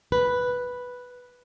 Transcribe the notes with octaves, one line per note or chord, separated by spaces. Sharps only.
B4